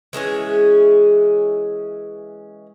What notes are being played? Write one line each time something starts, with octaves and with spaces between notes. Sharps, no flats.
E3 G#3 C#4 G#4